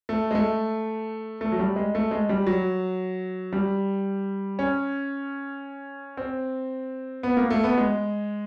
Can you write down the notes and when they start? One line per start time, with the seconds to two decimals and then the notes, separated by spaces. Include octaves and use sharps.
0.09 A3
0.31 G#3
0.35 A3
1.41 A3
1.52 F#3
1.59 G3
1.76 G#3
1.95 A3
2.11 G#3
2.29 G3
2.47 F#3
3.53 G3
4.59 C#4
6.17 C4
7.23 B3
7.37 A#3
7.50 A3
7.64 B3
7.78 G#3